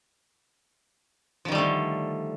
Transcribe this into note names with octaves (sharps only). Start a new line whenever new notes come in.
D3 D#3 F3 G3 A3